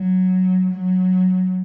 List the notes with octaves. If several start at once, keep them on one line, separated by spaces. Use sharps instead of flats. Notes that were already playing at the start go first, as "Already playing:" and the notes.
Already playing: F#3
F#3